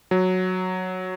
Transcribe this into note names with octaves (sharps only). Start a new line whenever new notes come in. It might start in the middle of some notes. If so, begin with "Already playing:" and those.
F#3